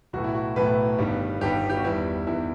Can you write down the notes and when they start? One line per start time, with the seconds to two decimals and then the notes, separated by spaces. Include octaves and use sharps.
0.13 B1 A2 E3 A3 F#4
0.24 E4
0.35 F#4
0.56 B1 A2 E3 A3 B4
0.98 G1 G2 D#3 G3 B3
1.41 G1 G2 D#3 G3 B3 G4
1.69 G4
1.77 F#4
1.84 E2 D#3 G3 B3 E4
2.27 E2 D#3 G3 B3 E4